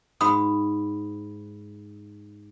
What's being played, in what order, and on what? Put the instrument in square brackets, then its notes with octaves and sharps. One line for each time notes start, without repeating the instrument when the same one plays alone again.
[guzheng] G#2 [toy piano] F#4 B5 D#6